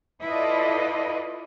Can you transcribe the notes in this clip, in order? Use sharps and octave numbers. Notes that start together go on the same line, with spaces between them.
E4 F4 A4 B4 D5 D#5